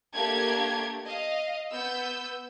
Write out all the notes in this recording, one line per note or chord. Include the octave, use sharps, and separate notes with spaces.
A3 A#3 D4 G4 G#6
D#5 F5
B3 E6 G6